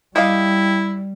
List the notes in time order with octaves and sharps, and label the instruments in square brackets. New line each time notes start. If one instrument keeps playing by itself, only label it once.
[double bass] G3 [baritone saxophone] E4 [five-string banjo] G4 D#5 F5